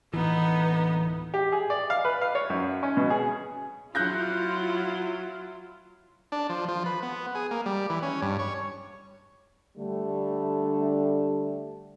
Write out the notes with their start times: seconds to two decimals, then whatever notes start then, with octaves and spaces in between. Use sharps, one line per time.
0.13 D1 E3 B3 D#4
1.34 G4
1.52 G#4
1.70 D5
1.90 F5
2.05 B4
2.21 F5
2.35 C#5
2.50 F#2
2.83 C#4
2.97 B2
3.10 G#4
3.95 F#3 E4 F4 F#6 G6 A#6
6.32 D4
6.49 F3
6.68 F3
6.86 B4
7.03 B3
7.35 G#4
7.51 A#3
7.66 G3
7.90 E3
8.02 C#4
8.22 G2
8.39 C#5
9.77 D3 G3 A3